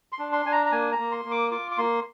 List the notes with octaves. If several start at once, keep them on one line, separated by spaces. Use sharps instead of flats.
C6
D4
C6
D4 G#5
A#5
A#5
A#3 G#5
A#5
A#3
C6
A#3
D6
F4 D6
D6
A#3 C6